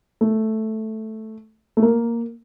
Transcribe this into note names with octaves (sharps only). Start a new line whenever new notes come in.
A3
A3
A#3